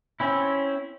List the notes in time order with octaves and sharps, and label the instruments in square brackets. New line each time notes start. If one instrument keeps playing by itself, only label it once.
[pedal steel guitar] C4 C#4 E4